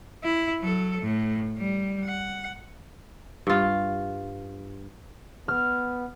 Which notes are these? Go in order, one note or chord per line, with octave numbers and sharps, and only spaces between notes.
E4
F#3 A4
A2
G3
F#5
G2 F4
B3 F6